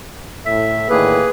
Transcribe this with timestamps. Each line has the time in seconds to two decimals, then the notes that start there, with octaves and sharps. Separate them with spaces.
0.46 A2 E5
0.90 A2 D3 D#3 A#3 G#4 B4